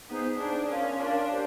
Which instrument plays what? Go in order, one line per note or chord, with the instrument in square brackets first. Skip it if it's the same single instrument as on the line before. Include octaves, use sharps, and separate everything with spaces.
[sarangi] B3 [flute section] D#4 G#4 C5
[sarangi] D4 [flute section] D#4 G#4 C5
[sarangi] C#4 [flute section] F4 A#4 D5 F5
[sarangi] D4 [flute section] F4 A#4 D5 F5
[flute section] G4 C5